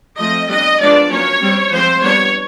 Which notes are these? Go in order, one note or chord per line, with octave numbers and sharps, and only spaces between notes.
F3 A3 C4 D#5
G3 B3 D4 D#5
F3 G#3 B3 D4 D5
F#3 A#3 C#4 C#5
G3 C4
F3 G#3 C4 C5
G3 B3 D4 C#5